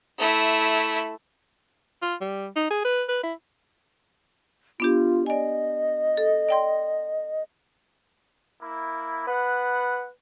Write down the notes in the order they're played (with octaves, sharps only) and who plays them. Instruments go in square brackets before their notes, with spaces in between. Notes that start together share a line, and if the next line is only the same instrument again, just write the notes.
[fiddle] A3 E4
[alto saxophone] F4
G3
D#4
G#4
B4
B4
E4
[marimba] B3 D4 G4 [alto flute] F4
[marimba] D5 G#5 [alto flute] D#5
[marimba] A4
D5 G5 C6
[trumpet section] A#3 E4
[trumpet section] B3 F#5 [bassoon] B4